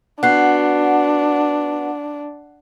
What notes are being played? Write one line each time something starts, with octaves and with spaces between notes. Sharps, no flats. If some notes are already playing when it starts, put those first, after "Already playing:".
B3 D4 F#4 F#5 F#6 C7